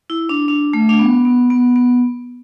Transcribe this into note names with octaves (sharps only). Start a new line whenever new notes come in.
E4
D4
D4
A3
D4
B3
B3
B3
B3